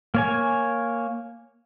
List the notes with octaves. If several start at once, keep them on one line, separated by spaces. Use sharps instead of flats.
A#3 C#5 G#5